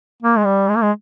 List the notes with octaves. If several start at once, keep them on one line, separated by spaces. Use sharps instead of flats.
A#3
G#3
G3
G#3
A#3
G#3